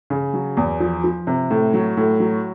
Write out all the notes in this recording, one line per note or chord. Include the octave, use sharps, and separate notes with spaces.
C#3
F#3
E2
F3
F3
C3
A2
F#3
A2
F#3